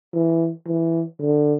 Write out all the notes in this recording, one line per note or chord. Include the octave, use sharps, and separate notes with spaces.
E3
E3
D3